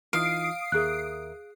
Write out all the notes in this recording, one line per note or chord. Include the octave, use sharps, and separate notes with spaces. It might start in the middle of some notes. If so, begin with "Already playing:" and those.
E3 D#4 F4 F5 D#6 C7 D7
D#2 G#4 A#4 E5 F#6